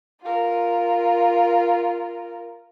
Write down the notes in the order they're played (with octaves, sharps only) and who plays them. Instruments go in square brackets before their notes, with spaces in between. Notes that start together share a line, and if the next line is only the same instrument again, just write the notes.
[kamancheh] F4 A#4